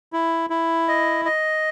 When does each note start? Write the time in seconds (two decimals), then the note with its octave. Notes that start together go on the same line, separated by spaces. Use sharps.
0.13 E4
0.50 E4
0.88 D#5
1.25 D#5